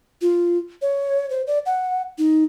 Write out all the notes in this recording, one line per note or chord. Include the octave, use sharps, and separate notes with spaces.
F4
C#5
C5
D5
F#5
D#4